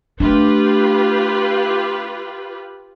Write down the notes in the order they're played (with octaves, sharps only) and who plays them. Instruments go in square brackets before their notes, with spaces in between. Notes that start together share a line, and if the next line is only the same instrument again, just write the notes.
[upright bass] A3 D4 [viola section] F4 G4 B4